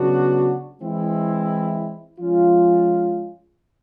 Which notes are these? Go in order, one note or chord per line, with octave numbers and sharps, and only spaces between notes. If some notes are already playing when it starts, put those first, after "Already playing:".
Already playing: C#3 F#3 B3 D4 F#4
E3 G#3 C4 E4
F3 G#3 C#4 F4